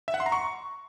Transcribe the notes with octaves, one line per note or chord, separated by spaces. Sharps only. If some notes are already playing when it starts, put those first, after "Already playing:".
E5
F#5
C6
A#5
C#6